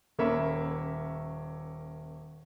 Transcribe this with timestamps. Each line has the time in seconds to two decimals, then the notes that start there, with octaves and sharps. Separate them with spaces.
0.19 D#1 A#3 C#4 E5 B5